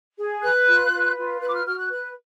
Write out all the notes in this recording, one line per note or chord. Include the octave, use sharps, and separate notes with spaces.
G#4
B4 F#6
F4
B4
F4
B4 F#6
D6
F6
F#4 F6
F#6
B4 F#6